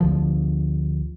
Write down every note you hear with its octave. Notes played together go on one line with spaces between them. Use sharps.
D2 D3 F3